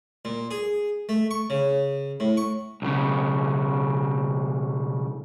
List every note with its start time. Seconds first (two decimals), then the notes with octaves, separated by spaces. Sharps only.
0.25 A#2
0.51 G#4
1.09 A3
1.31 C#6
1.50 C#3
2.20 A2
2.37 C#6
2.82 B1 C#3